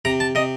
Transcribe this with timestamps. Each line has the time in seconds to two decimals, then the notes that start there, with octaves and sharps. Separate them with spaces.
0.05 C3 A#5
0.20 A5
0.35 C3 D#5